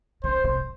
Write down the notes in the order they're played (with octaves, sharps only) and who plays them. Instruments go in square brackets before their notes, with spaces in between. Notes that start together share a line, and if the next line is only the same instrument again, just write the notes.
[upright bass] C#3 [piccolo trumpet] C5
[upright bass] C3